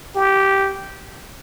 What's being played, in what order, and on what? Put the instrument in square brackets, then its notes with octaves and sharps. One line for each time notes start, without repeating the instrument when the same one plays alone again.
[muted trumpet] G4